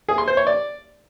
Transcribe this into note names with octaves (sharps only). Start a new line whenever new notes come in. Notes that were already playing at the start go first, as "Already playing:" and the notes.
G#4
C6
C5
C#5
D5